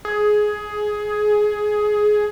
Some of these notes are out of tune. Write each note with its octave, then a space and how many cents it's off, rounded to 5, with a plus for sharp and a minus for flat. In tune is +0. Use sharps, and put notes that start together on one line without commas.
G#4 +15